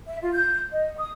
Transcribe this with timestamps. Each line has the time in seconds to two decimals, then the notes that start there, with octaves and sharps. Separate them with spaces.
0.07 E5
0.21 F4
0.34 G6
0.72 D#5
0.97 D#6